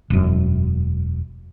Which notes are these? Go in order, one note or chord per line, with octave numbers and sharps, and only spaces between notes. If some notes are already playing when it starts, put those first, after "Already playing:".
E1 F#2